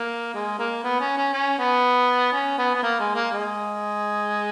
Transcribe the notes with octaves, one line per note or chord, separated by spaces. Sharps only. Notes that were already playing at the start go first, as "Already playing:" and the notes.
Already playing: A#3
G#3
A#3
B3
C#4
C#4
C#4
B3
C#4
B3
B3
A#3
G#3
A#3
G#3